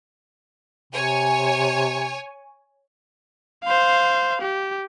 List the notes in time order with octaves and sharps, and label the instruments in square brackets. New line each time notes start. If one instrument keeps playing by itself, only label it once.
[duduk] C3 [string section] C#5 G#5
[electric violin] C5 F5
G4